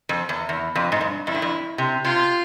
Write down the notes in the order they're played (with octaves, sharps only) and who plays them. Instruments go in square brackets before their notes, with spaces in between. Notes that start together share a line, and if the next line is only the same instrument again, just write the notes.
[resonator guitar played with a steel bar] F2
E2
E2
F2
G#2
G2
[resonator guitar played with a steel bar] F2 [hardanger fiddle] E4
[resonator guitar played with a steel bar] G2
F2
C3
[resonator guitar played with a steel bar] C3 [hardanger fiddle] F4